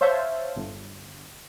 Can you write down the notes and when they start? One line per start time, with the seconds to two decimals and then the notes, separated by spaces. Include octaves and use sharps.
0.01 C5 C#5 E5 F5 A5
0.56 G1